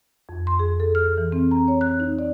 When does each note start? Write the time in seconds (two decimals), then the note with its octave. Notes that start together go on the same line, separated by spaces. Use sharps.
0.29 F2
0.47 C6
0.59 G#4
0.80 A4
0.95 F6
1.18 E3
1.32 C4
1.51 A#5
1.68 C#5
1.81 F#6
2.00 D#4
2.19 D5